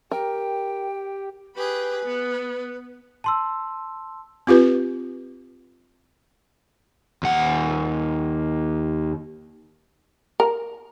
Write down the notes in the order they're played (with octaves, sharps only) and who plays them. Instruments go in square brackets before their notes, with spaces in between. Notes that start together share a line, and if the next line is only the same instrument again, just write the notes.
[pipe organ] G4 [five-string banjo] A#4 [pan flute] G5
[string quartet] G4 G#4 B5 [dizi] B4
[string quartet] B3
[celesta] A5 C6 E6
[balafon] C4 F4 G4 B4
[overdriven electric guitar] D#2 F#5
[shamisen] A#4